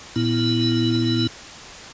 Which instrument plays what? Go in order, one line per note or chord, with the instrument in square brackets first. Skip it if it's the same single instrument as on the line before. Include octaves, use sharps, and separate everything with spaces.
[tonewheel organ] A#2 B3 E4